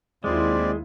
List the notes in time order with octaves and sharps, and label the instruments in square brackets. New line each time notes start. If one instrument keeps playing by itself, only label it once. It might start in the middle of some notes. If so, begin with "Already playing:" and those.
[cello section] D#2 E4 F4 [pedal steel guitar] G#3 [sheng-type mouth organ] C4 D5